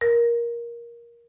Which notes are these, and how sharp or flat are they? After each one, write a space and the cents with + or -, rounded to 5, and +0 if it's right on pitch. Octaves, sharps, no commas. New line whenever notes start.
A#4 +15